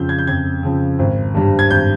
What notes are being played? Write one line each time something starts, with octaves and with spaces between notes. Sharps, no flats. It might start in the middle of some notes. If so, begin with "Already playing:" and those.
Already playing: F2 C#3 F3 G6
G#6
G6
F2 G#6
C#3 F3
G#1
G2 G3
G#6
G#1 G6